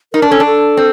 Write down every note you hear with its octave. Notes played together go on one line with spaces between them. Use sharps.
D#4 A#4
D4
C#4 A4
D4
A4
C4